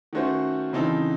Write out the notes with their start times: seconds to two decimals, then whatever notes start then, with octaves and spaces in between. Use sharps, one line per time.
0.13 D#3 A3 C#4 F#4 C5
0.73 C#3 E3 C4 D#4 A4